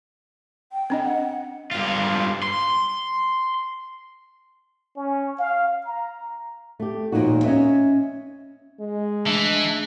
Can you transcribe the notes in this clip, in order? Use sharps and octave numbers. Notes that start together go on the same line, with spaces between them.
G5
C4 D4 D#5
F#5
G2 F4
C6
C#4
F5
A#5
A3 G4
D#2 A#2 D3 F3 D#4 F#4
C#4 D#5 E5
G#3
E3 A3 D4